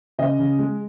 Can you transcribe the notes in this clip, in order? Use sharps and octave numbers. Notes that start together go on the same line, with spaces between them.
C#3 D#5
C#3
G#3